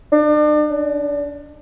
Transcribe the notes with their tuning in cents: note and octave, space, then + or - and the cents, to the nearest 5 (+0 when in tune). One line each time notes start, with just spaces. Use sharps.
D4 +40
D4 -30